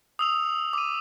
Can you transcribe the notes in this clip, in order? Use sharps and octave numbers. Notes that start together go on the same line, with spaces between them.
D#6 E6 F7
D6 D#7